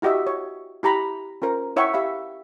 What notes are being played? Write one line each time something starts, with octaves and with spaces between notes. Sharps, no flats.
E4 F#4 G4 D#5 E5
C#5
E4 G4 A#5 B5
C#4 F4 A#4 C5
E4 C#5 E5 F#5 G5 C#6
G4 E5 F5 B5